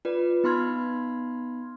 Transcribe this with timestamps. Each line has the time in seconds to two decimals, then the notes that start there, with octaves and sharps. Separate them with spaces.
0.05 F4 B4 D5
0.44 B3 D#4 B5 C6 F6 G#6